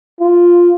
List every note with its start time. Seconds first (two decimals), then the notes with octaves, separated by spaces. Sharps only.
0.20 F4